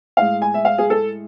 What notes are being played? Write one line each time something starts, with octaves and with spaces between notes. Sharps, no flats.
A2 G#3 F5
G#5
E5
F5
G#4
A4